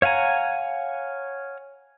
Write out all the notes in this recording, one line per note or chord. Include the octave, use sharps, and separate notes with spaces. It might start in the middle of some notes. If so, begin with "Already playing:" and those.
C#5 F5 F#5 G#5 A#5